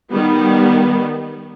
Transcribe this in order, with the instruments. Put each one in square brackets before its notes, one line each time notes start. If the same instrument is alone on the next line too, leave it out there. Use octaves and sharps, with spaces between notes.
[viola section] D#3 G3 B3